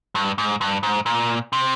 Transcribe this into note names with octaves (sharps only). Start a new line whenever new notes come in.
G2
G#2
G2
G#2
A#2
C3